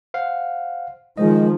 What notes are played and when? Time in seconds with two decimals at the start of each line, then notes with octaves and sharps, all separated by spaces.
0.14 C5 F5 F#5
1.17 D#3 F3 G#3 C5 D#5